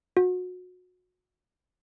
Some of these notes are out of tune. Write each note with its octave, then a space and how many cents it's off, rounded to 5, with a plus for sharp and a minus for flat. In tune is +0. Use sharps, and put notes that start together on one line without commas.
F#4 -30